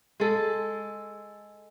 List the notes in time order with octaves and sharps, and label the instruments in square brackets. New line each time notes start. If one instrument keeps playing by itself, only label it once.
[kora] G#3 A4